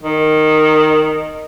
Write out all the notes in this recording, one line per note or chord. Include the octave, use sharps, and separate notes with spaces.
D#3